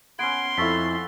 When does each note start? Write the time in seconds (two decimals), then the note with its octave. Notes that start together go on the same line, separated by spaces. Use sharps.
0.19 B3 C#4 C6 G#6 D7
0.58 F2 E4 A4 F5 C#6 A6 B6